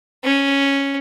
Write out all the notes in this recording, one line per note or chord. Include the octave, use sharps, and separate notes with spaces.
C#4